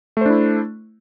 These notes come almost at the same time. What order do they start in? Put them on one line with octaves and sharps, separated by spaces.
A3 C5 D4 E4